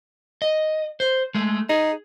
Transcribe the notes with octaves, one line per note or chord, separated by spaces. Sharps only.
D#5
C5
G#3 A3
D#4 G#4